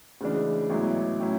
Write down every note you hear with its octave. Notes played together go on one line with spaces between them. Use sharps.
D2 C#3 E3 G#3 D4
A1 G#2 F#3 B3 E4
A2 F#3 C#4 E4